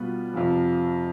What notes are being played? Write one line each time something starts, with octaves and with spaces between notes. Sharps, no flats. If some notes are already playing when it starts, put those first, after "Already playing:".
Already playing: B2 G3 B3 F4 B4
F2 C3 F3